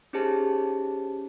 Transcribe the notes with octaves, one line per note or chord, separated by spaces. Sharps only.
C#4 D#4 G4 G#4 C5 A5